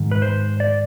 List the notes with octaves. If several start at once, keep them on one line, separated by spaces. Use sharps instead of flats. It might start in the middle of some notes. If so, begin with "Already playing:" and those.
Already playing: G#2 D#3
B4
C5
D5